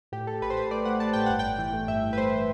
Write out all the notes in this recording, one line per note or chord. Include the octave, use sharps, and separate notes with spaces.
A2 G4
A2 A4
A1 B4
C5
A3 B4
A3 D5
A3 F#5
A3 A5
A2 G5
G1 F#5
G1 G5
E3
A3
G2 E5
E3
B4
A3 C5